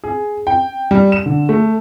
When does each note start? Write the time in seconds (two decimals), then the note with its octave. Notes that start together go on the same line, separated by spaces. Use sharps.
0.04 G#4
0.47 G5
0.91 G3
1.12 E7
1.26 D3
1.49 A3